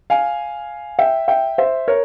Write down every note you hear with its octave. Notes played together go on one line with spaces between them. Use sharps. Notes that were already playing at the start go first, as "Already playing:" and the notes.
F5 G#5
E5 G5
E5 G5
C5 E5
A#4 C#5